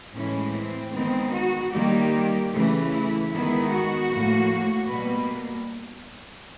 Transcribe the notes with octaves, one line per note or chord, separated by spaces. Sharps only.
A2 E3 G#3 C#4
C4
D#3 G#3 B3 C4
F#4
D#3 G3 A#3 G4
C#3 E3 A3
E4
D#3 G#3 B3 E4
F#4
A2 F3 A#3
B2 G3 A#3 B4